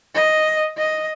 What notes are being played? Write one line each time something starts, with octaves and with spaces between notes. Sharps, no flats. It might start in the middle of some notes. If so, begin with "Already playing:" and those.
D#5
D#5